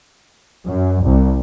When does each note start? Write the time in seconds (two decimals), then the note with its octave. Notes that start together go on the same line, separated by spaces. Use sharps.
0.65 F#2
1.03 C2